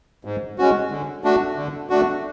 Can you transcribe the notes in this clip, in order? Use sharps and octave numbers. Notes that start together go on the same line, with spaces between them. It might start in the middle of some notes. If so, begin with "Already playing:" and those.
G#2
G#3 C#4 F#4
D3
A3 D4 F#4
D3
A3 D4 F#4